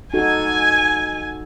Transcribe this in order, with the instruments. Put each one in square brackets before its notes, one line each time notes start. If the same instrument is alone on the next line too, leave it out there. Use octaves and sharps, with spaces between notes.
[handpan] D#4 F#4 A4 [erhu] G#5